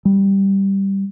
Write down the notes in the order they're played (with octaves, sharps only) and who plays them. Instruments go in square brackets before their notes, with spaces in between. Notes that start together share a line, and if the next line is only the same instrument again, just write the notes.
[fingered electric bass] G3